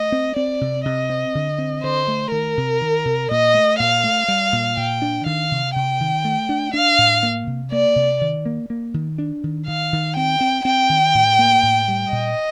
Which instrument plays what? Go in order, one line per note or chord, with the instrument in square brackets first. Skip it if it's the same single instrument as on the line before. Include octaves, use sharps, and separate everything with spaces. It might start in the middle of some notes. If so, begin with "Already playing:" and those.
Already playing: [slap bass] A3 [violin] D#5
[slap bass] C4
[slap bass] C4 [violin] D5
[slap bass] C3
[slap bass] C3 [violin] D#5
[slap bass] C4
D3
C4
[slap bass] D3 [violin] C5
[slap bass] A3
[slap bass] D#3 [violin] A#4
[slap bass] C3
D#3
C3
[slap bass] A#2 [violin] D#5
[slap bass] A3
[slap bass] A#2 [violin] F5
[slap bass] A3
G3
A#2
[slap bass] A#2 [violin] G5
[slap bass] D4
[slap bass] D#3 [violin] F5
[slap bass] C3
[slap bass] C3 [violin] G5
[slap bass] D#3
A3
D4
[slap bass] D4 [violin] F5
[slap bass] A2
A#3
C3
[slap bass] A#3 [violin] D5
[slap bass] C3
D#3
A#3
A#3
D#3
D4
D#3
[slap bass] D#3 [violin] F5
[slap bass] D#3
[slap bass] C4 [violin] G5
[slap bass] C4
[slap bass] C4 [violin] G5
[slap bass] D#3
A2
A#3
A2
G3
[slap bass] A#2 [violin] D#5